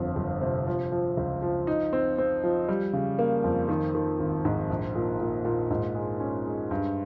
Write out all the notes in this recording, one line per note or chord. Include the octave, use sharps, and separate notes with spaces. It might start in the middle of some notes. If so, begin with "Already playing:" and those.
Already playing: G1 F2
G1
C3
F3
F3
C#2
F3
D#4
C4
C4
F3
G3
C#3
A#3
F2
D#3
D#3
G#1
G#2
A#1
A#2
A#2
A#2
G#2
G#3
C#4
G#3
G2